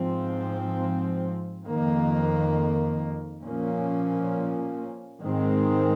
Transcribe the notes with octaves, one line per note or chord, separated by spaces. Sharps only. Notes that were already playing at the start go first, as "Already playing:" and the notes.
Already playing: G#2 F3 C4
F2 D#3 A#3
A#2 F3 A#3 C#4
G#2 D#3 G#3 C4